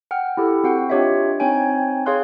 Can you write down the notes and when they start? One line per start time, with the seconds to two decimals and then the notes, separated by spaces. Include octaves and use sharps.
0.11 F#5 G5 F6
0.37 E4 G4 A4
0.64 C4 F#4 F#5 G5
0.90 D4 F4 G4 C#5 D#5 E5
1.40 C4 D#4 C#5 G5 G#5
2.06 G#4 C#5 F5 C6 F#6 G#6